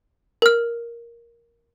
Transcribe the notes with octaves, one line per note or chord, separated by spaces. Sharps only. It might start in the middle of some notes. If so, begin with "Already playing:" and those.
A#4 F6